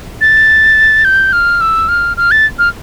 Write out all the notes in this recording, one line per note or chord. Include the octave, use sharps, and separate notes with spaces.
A6
G6
F6
E6
F6
F6
A6
F6